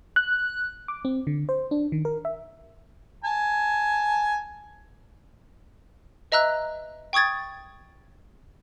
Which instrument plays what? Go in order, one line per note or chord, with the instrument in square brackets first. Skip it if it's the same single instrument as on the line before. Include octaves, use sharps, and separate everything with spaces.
[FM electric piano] F#6
D6
C4
D3
C5
D4
D#3
A#4
E5
[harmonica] G#5 A5
[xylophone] B4 D#5 E5 A#5 E6 F#6
G5 C#6 D#6 G#6 A6